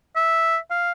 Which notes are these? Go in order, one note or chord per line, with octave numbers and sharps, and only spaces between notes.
E5
F5